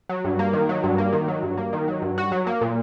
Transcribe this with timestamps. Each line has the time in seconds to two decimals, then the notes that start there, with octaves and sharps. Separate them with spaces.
0.09 F#3
0.25 G2
0.39 A#3
0.53 D#3
0.69 F#3
0.84 G2
0.98 A#3
1.13 D#3
1.28 F#3
1.43 G2
1.57 A#3
1.73 D#3
1.88 F#3
2.02 G2
2.18 F#4
2.32 F#3
2.47 A#3
2.61 A#2